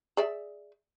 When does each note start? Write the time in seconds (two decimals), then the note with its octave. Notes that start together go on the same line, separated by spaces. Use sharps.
0.17 G#4 D5 E5